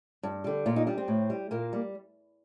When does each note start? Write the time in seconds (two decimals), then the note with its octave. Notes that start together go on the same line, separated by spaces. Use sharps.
0.23 G2
0.44 D3 G3
0.66 A#2 F4
0.76 D#4
0.87 G3 D4
0.98 C4
1.08 A2
1.30 G3
1.51 A#2 A#3
1.73 G3